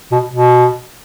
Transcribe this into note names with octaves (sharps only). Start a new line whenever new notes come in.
B2
B2